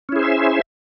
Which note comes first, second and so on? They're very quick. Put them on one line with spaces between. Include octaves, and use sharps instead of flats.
C#4 E4 G#4 C5 E5